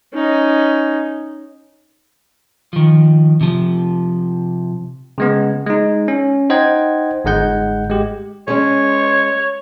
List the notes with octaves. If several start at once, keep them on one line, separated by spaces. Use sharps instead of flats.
C#4 D#4
D#3 F3
C3 F3
C#3 G#3 B3
G#3 D#4
C#4
D#4 C5 D#5 F#5 G5 G#6
G1 G#2 G#3 F#5 G6
G#3 G4
G#3 C#4 C#5